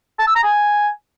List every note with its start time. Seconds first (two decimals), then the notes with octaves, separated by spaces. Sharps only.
0.19 A5
0.27 E6
0.35 A#5
0.43 G#5